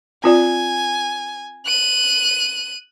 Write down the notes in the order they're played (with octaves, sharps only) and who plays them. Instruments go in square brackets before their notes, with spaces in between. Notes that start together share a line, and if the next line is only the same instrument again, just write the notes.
[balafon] C4 F4 D5 [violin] G#5
[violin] F#6 D#7